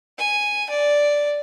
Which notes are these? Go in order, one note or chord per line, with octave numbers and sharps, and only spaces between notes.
G#5
D5